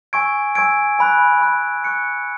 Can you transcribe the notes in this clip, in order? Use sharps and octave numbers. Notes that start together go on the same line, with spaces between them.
G#5 C#6 E6 G#6 D7
G#5 C#6 E6 G#6 D7
G#5 B5 F#6
G#5 B5 F#6
C#6 F#6 C#7